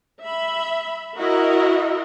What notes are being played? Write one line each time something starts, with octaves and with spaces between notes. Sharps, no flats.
E5 B5
E4 F#4 A#4 D#5